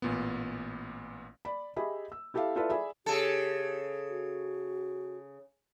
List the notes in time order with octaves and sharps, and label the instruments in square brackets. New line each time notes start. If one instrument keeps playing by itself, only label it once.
[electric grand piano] A1 A#2 B3
[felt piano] D5 B5
G4 G#4 D#5 E5 B5
E6
E4 G4 A4 E5 F5
E4 F4 A4 B4 D5 E5
G#4 D5 E5 B5
[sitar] C#3 A4 [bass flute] G4
[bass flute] F#4